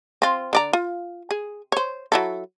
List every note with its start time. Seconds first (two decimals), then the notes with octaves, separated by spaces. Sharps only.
0.22 C4 F4
0.53 D3 D5 A#5
0.73 F4
1.31 G#4
1.72 C5 C#5
2.12 F#3 E4 A4